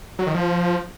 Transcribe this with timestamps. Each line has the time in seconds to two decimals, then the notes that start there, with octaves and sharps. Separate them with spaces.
0.19 F#3
0.27 D#3
0.35 F3